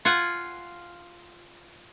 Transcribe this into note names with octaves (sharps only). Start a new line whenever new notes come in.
F4 F#5 G#5